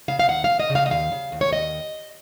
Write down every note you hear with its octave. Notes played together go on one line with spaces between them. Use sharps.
C#3 F5
F5
D#2 F#5
F5
D#2
D#5
C#3
F5
D#5
D#2 F5
C#3
D#2
C#5
D#2 D#5